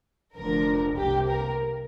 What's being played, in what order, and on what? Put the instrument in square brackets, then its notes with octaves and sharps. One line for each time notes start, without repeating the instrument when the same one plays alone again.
[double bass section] F1 F2 D3 F3 [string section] A#4
[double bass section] C2 C3 A#3 [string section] G4
[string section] A#4